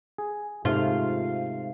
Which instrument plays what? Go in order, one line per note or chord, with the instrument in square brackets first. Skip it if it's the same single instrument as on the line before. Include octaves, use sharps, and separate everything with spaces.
[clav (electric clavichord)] G#4
[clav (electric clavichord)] G#2 C3 A3 [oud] F4 [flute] F5